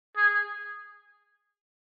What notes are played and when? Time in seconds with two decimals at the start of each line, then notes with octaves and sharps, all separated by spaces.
0.17 G#4